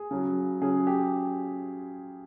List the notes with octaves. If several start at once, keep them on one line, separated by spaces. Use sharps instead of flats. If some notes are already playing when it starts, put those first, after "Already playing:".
Already playing: G#4
C#3 F#3
C#3 F#3 G#4
G4